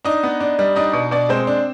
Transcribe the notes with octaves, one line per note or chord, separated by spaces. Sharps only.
D4 D#4 D#5
B3
D4
G3
D4 D#4 D#5
B2
B2 D4 D5
G#3 C4 C5
D4